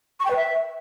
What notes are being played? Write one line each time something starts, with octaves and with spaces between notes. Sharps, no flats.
C#6
G5
B4
E5